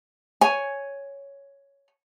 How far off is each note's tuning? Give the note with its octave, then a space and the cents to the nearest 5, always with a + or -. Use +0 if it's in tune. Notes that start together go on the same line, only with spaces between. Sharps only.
C#5 +5 G#5 +0